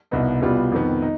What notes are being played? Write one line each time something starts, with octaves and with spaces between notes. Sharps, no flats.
C2 B2 B3 D#4
C2 B2 G3 B3 F4
F2 D#3 B3
D#4